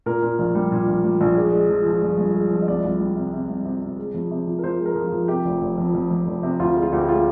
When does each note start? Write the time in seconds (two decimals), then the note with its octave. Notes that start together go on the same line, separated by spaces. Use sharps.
0.06 A#2 A#4
0.22 A#2
0.39 A#1
0.55 G3
0.72 A#2
0.88 A#1
1.04 G3
1.21 A#1
1.37 G#3 D5
1.53 G#3
1.69 F3
1.86 F3
2.02 G1
2.18 G2
2.34 G#3
2.51 F3
2.62 D#5
2.68 C2 D5
2.84 C2
3.00 G3
3.16 C3
3.33 C3
3.49 C2
3.65 C3
3.82 C3
3.99 G#3
4.14 F2
4.31 C3
4.47 F3
4.59 A#4
4.64 F3 C5
4.80 G#3
4.86 A#4
4.96 F3
5.06 F4
5.13 F3
5.28 C3 G4
5.45 F1
5.61 F1
5.78 F2
5.95 F2
6.11 F2
6.27 F1
6.43 C3
6.60 D2 F4
6.76 G#3
6.82 F4
6.92 D2 G4
7.03 G4
7.08 G#3 F4